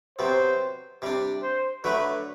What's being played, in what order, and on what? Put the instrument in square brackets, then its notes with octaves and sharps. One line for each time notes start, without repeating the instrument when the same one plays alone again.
[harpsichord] C3 F#3 B3 [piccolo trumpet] C5
[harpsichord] C3 G3 D4
[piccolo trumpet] C5
[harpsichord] D3 F#3 A3 [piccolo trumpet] B4